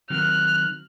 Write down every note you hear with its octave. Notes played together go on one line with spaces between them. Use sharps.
D#3 F#3 C4 F6 F#6